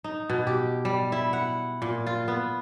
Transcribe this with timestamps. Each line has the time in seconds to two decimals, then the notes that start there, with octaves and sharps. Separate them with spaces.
0.04 D#4
0.30 B2
0.47 G4
0.85 G3
1.12 E4
1.33 F#5
1.82 A#2
2.07 F4
2.28 B3